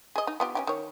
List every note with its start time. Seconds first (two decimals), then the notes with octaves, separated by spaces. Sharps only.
0.16 G#4 D#5
0.27 D#4
0.40 B3 F4 G4
0.55 C#4 F4 G4
0.67 D#3 C#5